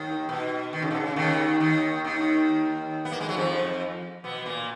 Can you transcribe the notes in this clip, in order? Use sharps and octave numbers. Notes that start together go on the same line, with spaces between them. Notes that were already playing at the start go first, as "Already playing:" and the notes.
Already playing: D#2 D#3
B2
D#3
C#3
B2
C#3
D#2 D#3
D#2 D#3
D#2 D#3
B3
A#3
G#3
F#3
F2 F3
B2 B3
A#2 A#3